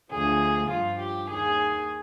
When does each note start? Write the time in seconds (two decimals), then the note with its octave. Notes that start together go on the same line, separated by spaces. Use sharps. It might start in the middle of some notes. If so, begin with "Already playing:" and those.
0.11 D2 D3 F3 G#4
0.70 G2 F3 F4
0.99 G4
1.28 D#2 D#3 G#4